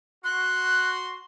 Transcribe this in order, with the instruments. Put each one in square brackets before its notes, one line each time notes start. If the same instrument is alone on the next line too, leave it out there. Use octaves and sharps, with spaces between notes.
[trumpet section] F#4 C6 [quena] F#6